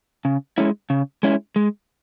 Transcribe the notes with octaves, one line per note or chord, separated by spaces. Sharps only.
C#3
G#3 C#4 E4
C#3
G#3 C#4 E4
G#3